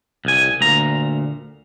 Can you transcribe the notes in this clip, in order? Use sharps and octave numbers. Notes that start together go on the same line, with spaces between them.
C2 G#5
D2 A#2 A#5